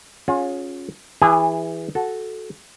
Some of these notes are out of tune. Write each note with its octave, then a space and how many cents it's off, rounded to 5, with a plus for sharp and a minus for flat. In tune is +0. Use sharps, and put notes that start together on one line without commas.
C#4 +0 F4 +35 G#4 +15
E3 +0 G#4 -30 G#5 +25
F#4 +0 A4 -10